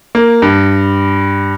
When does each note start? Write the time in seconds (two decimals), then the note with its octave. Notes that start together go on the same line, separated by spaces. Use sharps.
0.15 A#3
0.42 G2